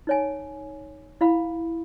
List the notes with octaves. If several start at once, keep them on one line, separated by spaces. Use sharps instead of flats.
D#4 C#5 G#5
E4 F5 B5